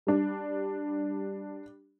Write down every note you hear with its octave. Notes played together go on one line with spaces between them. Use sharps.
G3 D4